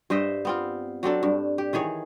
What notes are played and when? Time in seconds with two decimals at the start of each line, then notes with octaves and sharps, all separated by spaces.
0.10 G2 C5 D#5 E5
0.45 B3 C4 F4
1.03 F#3 C4 D4 A4
1.23 G2
1.58 G4
1.73 D#3 E3 G#4 C#5